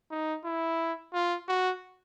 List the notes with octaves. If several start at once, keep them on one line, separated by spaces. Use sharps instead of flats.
D#4
E4
F4
F#4